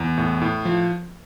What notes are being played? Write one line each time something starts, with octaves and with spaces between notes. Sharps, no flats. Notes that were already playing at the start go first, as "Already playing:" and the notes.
Already playing: E2
A2
A2
F3